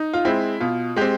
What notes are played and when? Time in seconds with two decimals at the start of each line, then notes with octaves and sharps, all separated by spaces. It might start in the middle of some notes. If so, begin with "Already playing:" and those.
Already playing: D#4
0.13 F4
0.25 G#3 C4 E4
0.60 B2 F4
0.96 G#3 C4 G4